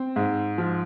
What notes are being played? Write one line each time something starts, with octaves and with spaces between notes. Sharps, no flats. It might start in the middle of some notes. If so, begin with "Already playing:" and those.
Already playing: C4
G#2
F3